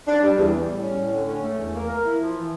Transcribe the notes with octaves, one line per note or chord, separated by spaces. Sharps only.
D4
G3
E2
G3
A2
C#4
A2
D3
C#4
A3
E2
A#3
A#4
E4
F3
E3